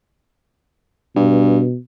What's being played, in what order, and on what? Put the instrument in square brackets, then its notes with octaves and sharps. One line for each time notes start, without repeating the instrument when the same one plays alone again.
[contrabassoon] G2 [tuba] B2